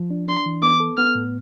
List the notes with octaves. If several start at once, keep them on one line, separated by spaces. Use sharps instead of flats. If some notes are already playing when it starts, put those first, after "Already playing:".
Already playing: F3
D4
D4 C6
E3
B3 D6
A4
B3 F6
A2